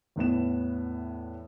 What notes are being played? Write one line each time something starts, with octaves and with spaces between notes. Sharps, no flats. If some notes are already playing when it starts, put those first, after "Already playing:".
E2 A2 B3 E7